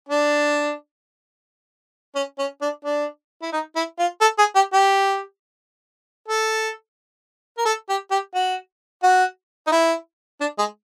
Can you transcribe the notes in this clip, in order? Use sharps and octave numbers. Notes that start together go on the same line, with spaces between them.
D4
C#4
C#4
D4
D4
E4
D#4
E4
F4
A4
G#4
G4
G4
A4
A#4
A4
G4
G4
F#4
F#4
D#4
E4
D4
G#3